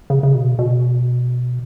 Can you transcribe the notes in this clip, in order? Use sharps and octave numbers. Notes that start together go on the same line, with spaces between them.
C#3
C#3
B2
B2